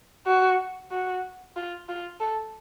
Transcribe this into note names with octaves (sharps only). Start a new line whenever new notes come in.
F#4
F#4
F4
F4
A4